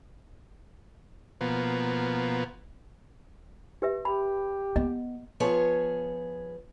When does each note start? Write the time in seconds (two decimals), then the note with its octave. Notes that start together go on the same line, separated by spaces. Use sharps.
1.41 B2 F3 A#3 B3
3.82 G4 B4 E5
4.05 G4 B5
4.76 B3 D#5
5.40 F3 B3 G#4 C#5